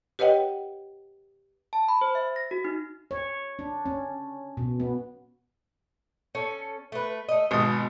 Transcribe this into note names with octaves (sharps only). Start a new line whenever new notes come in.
G4 B4 C#5 D#5 F#5 G5
A5
B5
C5
E5
A#6
F#4
D#4
C#5
D4
C#4
B2
B3
C#4 A4
A3 B4
A3 D#5
G#1 B2 D#6